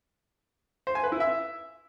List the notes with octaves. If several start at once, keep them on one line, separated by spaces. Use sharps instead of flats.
C5
G#5
B4
E4
E5